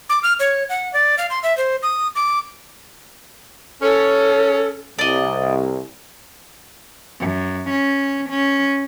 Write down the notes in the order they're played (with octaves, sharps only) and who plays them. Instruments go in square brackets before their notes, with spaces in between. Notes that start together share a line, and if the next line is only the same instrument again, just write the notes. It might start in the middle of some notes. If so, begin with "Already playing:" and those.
[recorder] D6
F6
C#5
F#5
D5
F5
C6
E5
C5
D#6
D6
[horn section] C#4 [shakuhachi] A4
[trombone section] C2 [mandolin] D5 D#5
[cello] F#2
C#4
C#4